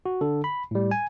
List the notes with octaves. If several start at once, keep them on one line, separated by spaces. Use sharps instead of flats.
F#4
D3 A4
B5
A2 G3
G#5